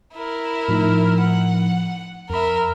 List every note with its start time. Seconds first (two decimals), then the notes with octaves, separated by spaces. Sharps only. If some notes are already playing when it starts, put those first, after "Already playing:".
0.14 E4 A#4
0.68 A2 F3 D#4
1.20 F#5
2.30 F2 A#4 E5 B5